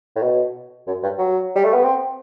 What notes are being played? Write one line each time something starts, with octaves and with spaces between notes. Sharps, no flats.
A2
B2
F#2
G2
F#3
G3
A3
B3
C4